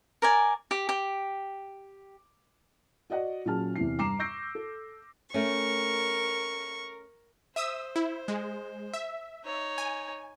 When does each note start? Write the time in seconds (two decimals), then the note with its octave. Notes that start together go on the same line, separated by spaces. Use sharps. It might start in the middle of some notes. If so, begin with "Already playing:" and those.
0.22 A#4 D5 G#5
0.71 G4
0.89 G4
3.10 F#4 D5 D#5 F#5
3.45 A#2 F#3 C#4 G#4 A5 F6
3.76 E2 C3 E3 C7
3.98 G2 A#5 D6 C7 E7
4.19 C#6 E6 G6 A#6 C7 D7
4.55 A4
5.34 A3 C#4 A#4 C#6
7.56 C5 E5 D#6 E6
7.96 E4
8.28 G#3
8.93 E5
9.45 D#4 C#5
9.78 G#5